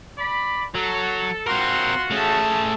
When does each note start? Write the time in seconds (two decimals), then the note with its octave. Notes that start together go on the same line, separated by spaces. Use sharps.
0.18 D5 B5
0.75 F#3 A4
1.47 C4 F4 F#4 A#4 C6
2.11 A3 C#4 G#4 A5